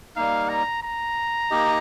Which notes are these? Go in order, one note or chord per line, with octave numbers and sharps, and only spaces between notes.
G3 A#3 D#4 F5
A#5
A#5
A#3 D#4 G4 D#5